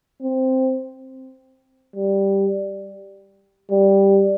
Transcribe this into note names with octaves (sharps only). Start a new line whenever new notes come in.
C4
G3
G3